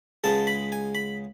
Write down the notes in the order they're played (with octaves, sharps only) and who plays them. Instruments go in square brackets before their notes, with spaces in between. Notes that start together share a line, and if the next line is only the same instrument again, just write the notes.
[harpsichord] C#2 C#3 G#3 B3 A5
B5
G#5
B5